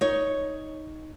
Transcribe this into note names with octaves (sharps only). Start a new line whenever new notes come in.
D#4 C#5